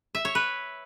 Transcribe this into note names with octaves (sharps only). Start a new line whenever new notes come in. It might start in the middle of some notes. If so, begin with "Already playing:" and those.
E5
C#5
B4